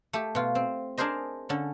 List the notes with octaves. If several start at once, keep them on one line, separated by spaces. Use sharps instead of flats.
A3 G4
B2 F4
C4
D4 G#4 A#4 C5 D#5
D3 C#4